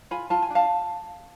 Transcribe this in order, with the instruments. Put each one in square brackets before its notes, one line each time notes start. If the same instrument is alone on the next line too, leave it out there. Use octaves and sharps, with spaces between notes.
[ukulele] F4 G#5 B5
F4 A5
G#5
D4 F5 A5